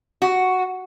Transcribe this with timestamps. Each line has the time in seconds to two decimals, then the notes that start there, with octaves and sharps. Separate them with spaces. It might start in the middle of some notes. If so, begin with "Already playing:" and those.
0.22 F#4